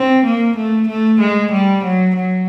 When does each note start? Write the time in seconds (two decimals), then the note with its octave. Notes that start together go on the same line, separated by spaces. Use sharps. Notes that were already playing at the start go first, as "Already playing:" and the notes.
Already playing: C4
0.25 A#3
0.56 A3
0.89 A3
1.20 G#3
1.52 G3
1.84 F#3
2.16 F#3